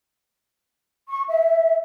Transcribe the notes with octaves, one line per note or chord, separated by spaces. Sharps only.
C#6
E5